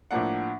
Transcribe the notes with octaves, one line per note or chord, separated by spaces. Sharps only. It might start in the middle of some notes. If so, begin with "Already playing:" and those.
A2 F3 A#3 D4 F#5